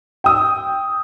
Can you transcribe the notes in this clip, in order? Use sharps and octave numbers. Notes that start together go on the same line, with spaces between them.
G5 D#6 E6